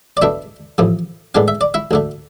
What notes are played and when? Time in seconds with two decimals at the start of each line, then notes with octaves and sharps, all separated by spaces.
0.17 D5
0.22 B2 A3 D4 E4 E5
0.78 A1 A2 F3
1.35 A2 G#3 B3 D4 F5
1.48 E5
1.61 D5
1.74 E4 E5
1.91 D2 D3 A3